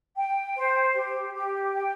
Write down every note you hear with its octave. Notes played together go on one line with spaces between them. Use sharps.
G5
C5
G4
G4
G5